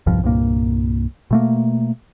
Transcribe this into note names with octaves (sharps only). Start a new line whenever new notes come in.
D#1 C2 G2 F3
C2 G2 A#2 A#3
B2 A3 A#3